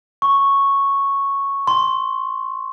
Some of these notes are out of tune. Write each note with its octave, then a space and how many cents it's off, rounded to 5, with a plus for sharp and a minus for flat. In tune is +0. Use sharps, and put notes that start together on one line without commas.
C#6 -5
C6 +5